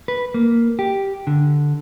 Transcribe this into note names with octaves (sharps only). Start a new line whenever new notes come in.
B4
A#3
G4
D3